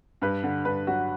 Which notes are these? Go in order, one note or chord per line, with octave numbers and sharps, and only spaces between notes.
G2 B4
D3
G2 B4
F#3 F#4